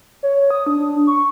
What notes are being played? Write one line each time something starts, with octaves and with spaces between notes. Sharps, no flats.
C#5
D#6
D4
C#6